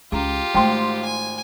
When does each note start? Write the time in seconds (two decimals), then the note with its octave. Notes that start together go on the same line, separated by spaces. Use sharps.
0.12 C#2 F4 G4 G#4 A#5
0.55 G#1 D#3 A3 G5 C6
1.04 G#5